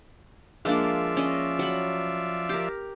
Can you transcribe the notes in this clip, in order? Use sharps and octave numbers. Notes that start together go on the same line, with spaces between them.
F3 G#3 A#3 D4 D5 E5
C#4 D#5
F#3 B5
G4 A#4